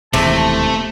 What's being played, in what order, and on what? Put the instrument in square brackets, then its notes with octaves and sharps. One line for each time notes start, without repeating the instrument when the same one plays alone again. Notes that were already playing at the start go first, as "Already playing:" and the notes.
[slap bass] E1 D#2 E3 [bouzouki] C3 [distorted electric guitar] A3 [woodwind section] A5